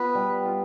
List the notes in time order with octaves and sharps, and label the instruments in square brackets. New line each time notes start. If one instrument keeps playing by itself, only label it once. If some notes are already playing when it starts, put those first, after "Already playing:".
Already playing: [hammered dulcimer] B3 F4 [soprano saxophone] B4
[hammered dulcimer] G3
F4